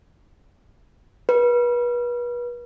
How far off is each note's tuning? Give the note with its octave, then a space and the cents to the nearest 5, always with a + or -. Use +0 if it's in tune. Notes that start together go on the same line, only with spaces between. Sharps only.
B4 -35